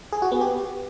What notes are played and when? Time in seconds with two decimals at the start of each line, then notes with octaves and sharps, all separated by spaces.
0.13 G#4
0.22 F#4
0.32 B3
0.41 G4